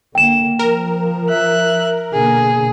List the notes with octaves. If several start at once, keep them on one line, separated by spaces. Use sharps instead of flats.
D3 A#3 G5 E7
F3 A#4
E5 F#6
B2 D3 A#3 G#4